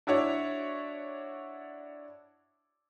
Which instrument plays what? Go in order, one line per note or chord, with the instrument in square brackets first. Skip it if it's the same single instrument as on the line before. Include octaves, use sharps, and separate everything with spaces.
[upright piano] D4 E4 F#4 C#5 D5